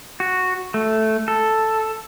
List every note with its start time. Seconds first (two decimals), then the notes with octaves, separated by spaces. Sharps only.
0.20 F#4
0.74 A3
1.28 A4